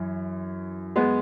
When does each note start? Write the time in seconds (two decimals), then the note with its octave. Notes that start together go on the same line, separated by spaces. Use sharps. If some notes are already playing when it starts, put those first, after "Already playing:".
Already playing: F#2 E3
0.96 G#3 B3